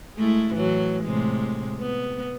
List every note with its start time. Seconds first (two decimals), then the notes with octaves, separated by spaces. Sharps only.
0.15 G#3 A3 E4
0.53 A2 E3 F#3
1.04 A2 C3 G#3
1.80 B3